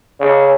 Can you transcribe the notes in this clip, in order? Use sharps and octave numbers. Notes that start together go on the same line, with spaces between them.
C#3